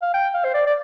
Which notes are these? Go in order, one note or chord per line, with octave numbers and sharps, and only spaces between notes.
F5
G5
F5
C5
D5
D5